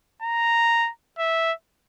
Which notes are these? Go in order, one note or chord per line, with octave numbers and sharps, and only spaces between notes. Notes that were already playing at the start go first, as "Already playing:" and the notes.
A#5
E5